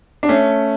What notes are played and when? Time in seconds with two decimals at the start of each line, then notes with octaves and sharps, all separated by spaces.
0.23 D4
0.29 A3 C#4